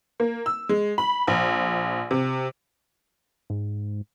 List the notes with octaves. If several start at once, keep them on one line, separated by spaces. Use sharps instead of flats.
A#3
E6
G#3
B5
A#1
C3
G#2